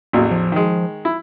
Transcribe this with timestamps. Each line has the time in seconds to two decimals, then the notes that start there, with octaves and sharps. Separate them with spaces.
0.13 A1 E2 F#3 A#3
0.31 F3
0.52 D#3 G#3
1.05 E4